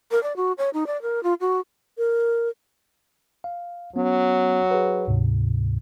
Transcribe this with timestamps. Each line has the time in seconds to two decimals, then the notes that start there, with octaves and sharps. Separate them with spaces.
0.11 A#4
0.23 D5
0.36 F#4
0.58 C#5
0.74 D#4
0.87 D5
1.02 A#4
1.23 F4
1.40 F#4
1.98 A#4
3.44 F5
3.96 F#3 B3 C#4
4.71 G#4 B4
5.08 D2 G#2 C3